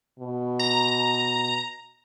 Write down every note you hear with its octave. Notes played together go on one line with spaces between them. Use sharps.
B2
A#5